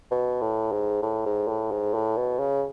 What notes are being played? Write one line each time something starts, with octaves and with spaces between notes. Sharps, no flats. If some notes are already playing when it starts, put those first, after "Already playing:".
B2
A2
G#2
A2
G#2
A2
G#2
A2
B2
C#3